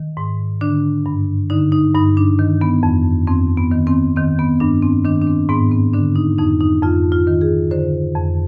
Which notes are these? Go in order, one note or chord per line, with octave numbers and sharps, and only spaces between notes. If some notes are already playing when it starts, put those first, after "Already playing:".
Already playing: D#3
G#2
D3 D4
G2
D3 D#4
D#4
G2 D#4
D4
D#3
B3
F2
F2 C4
B3
D#3
C4
D#3 C4
B3
G2 D4
C4
D#3 D4
D4
C4
G#2 B3
C4
D3 D4
D#4
F2 D#4
D#4
F2 F4
F4
D#3
G#4
D3 C5
F2